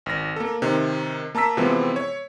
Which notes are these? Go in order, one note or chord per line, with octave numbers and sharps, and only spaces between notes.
G#1 A#6
A#3 A4
C3 D#3
A#3 A5 A#5 E6 B6
C3 E3 F3 G#3 B3 C4
C#5